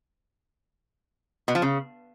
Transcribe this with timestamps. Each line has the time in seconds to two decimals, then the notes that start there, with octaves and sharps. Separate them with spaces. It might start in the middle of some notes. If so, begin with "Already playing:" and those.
1.48 B2
1.55 F3
1.62 C#3